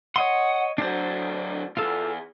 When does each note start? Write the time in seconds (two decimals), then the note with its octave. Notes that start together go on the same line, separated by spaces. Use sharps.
0.16 C#5 D#5 F#5 C6
0.78 D2 F#3 D4 C5
1.77 E2 G#2 F4 A4